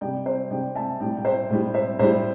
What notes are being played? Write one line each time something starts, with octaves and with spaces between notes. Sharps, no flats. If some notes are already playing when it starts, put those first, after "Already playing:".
C3 G3 D5 G5
C5 E5
C3 G3 D5 G5
E5 A5
A2 G3 D5 G5
G5
C5 E5
A2 G3
C5 E5
A2 G3 C5 E5